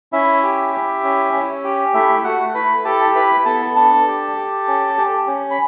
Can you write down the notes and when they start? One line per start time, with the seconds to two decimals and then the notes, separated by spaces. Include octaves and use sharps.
0.13 C#4 E4 E5
0.43 G4
0.73 G4
1.04 C#4
1.33 C#4
1.64 G4
1.94 A3 E4 E5
2.24 A3 F#4 F#5
2.54 E4 B4 B5
2.85 G4 A4 A5
3.15 E4 B4 B5
3.45 B3 A4 A5
3.75 D4 A4 A5
4.07 G4
4.37 G4
4.68 C#4
4.97 G4
5.27 C#4
5.51 B5